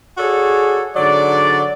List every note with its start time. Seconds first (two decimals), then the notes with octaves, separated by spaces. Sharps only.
0.18 F#4 G#4 A4 C#5 D5
0.94 G#2 D3 F#3 D5